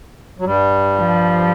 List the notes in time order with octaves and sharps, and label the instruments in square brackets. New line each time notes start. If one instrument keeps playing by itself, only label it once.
[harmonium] F#3
G2 G3
[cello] F3